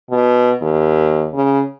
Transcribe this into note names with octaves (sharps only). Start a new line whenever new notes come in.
B2
D#2
C#3